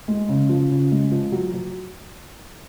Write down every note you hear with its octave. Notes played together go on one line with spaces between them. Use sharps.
G#3
C#3
F3
C#3
G#3
F3
F#3
F#3